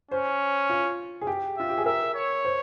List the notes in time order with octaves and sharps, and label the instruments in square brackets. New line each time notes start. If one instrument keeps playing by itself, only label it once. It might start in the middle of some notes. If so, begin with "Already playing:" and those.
[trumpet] C#4 [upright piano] C5
[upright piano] F4
G#4
G4
[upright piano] F4 [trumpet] E5
[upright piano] G4
G#4
[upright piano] A#4 [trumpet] E5
[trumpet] C#5
[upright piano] C5